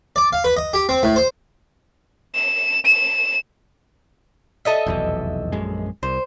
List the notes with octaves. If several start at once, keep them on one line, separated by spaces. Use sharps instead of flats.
D5
F5
B4
D#5
G4
C4
A2
C5
E7
E7
A4 D#5 E5
F1 B1 E2
A#1 F#2 G#3
C2 C5